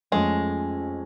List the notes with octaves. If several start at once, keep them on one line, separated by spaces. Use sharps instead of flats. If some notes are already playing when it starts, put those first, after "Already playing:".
F2 F3 G#3 A3 C#4